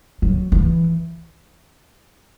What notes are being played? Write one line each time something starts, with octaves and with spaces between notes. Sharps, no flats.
F#3
E3